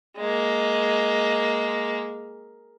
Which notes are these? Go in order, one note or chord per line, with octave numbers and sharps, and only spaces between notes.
G#3 A#3